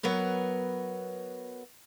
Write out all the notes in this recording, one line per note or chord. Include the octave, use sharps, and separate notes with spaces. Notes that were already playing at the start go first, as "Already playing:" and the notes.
F#3 B3 A#4 B4